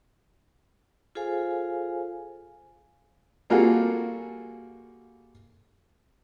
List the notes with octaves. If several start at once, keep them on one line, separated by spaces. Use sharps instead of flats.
F4 G#4 A4 C5 F5 G#5
G3 A#3 F4 F#4 G#4 A4